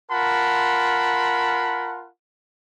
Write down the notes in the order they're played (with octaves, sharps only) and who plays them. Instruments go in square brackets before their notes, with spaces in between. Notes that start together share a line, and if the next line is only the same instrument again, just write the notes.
[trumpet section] F4 A#4 F#5 A5 B5 C6